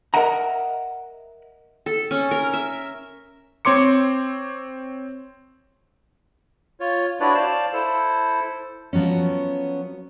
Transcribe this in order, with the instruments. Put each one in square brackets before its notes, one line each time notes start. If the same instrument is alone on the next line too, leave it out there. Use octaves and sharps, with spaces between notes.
[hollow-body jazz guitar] A#4 D#5 E5 F#5 A#5
[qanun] A4
C#4
A#4
E5
[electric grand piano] C4 C#5 C6 D6 C#7
[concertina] F4 C#5
D4 E4 F#4 B4 C#5 D5
C5 D5 F5 A5
E4 A4 C5
[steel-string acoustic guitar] F3 F#3 B3 C#4